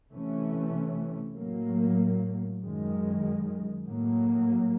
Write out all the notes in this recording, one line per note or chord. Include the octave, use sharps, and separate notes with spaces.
C3 E3 A3 C#4
A2 F#3 A#3
F#2 D#3 G#3
A2 F#3 A#3